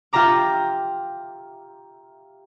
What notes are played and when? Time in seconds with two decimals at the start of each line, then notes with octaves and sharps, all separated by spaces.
0.13 F4 G4 E5 A#5 D6